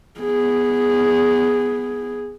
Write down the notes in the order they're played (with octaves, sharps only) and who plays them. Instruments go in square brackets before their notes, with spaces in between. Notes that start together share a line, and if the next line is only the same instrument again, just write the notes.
[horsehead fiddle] B3 G#4